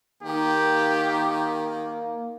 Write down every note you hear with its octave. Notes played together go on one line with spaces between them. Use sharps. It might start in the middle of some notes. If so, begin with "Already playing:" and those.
D#3 A#3 G4